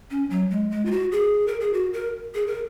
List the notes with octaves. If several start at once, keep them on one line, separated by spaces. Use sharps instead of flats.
C#4
F#3
G#3
G#3
F4
F#4
G#4
A#4
G#4
F#4
A#4
G#4
A#4